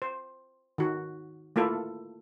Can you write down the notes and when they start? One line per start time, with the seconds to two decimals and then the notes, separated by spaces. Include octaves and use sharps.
0.02 C5
0.78 D#3 F#4
1.56 A3 A#3 E4 F4 A4